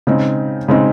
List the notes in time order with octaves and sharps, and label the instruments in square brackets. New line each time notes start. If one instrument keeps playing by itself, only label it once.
[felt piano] C#3 G#3 C4 D#4
C#3 G#3 C4 D#4